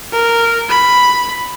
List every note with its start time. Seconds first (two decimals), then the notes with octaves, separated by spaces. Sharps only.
0.12 A#4
0.69 B5